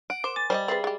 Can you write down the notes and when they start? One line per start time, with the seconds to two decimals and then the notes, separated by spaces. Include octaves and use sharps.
0.10 F#5 D7
0.24 A#4 C5 C6 D6 E7
0.36 G#5 D6 A6
0.50 G3 C5 D5 D#5
0.68 C4 G#4 B4 E5 C7
0.84 G#3 G4 A6